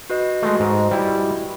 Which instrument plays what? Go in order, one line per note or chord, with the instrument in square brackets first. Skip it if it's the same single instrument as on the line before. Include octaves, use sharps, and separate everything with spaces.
[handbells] F#4 B4 D#5
[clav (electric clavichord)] G#3 A3
G#2
G3 E4